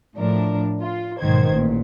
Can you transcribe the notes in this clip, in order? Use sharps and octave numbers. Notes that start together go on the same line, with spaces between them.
A2 F3 D4 A#4
F4
B1 G#2 D#3 C5 G#6
A1 A#2